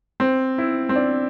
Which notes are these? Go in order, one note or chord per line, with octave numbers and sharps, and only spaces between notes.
C4
E4
C4
D4